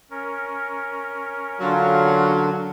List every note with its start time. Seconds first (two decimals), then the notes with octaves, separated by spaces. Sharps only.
0.11 C#4 A#4
1.60 D3 F#3 D4 F4